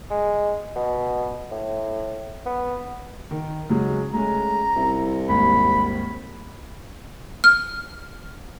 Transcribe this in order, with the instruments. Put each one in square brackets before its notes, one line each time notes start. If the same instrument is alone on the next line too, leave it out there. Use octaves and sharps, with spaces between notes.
[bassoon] G#3
B2
A2
B3
[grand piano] D#3
C#3 F#3 G#3
[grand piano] G#3 A3 C#4 [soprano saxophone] A#5
[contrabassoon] C2 [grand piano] E4
[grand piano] G#1 D#2 [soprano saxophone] B5
[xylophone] F6